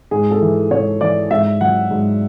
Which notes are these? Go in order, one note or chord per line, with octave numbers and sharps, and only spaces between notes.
G#2 G#4
A4
E3
G#2 C#5
E3 D5
G#2 E5
F#3 F#5
G#2